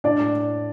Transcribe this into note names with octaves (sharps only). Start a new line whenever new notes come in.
A2 D4 D5
A2